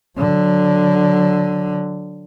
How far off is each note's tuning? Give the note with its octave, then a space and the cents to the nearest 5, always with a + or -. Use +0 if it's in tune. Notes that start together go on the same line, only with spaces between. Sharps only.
D3 +0 F#3 -10